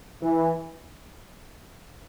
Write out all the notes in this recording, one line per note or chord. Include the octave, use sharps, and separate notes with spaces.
E3